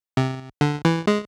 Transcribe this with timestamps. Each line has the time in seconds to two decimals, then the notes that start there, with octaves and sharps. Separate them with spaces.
0.17 C3
0.61 D3
0.85 E3
1.07 G#3